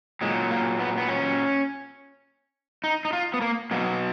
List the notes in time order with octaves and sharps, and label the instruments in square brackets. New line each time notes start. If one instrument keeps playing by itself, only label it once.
[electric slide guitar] A#2 F#3 G#3
A#3
B3
B3
C#4
D#4
D#4
F4
B3
A#3
B2 F#3 A#3